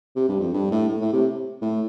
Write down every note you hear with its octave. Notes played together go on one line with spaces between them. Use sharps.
C3
G2
F2
G2
A2
A2
A2
C3
A2